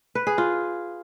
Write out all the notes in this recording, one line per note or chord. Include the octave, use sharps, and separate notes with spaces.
B4
G#4
F4